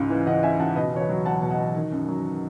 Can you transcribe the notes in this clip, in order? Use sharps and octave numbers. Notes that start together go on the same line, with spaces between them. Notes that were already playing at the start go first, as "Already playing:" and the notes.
Already playing: C#2 G#2 C#3
E3
C#2 D#5 F#5
C#3 E5 G#5
C#2 F#5 A5
B2 B4 D#5
E2 C#5
B4 D#5
F#3
E2 F#5 A5
B2
D#5 F#5
E2
D#3
F#2
F#3